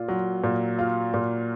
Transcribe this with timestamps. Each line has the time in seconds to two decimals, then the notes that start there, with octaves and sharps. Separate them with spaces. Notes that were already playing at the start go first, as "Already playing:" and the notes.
Already playing: A#2 F4
0.08 F#3
0.44 A#2
0.79 F4
1.14 A#2